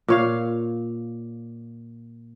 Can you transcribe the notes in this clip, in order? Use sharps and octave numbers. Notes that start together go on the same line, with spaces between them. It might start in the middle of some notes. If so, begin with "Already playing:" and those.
A#2 C#5 F5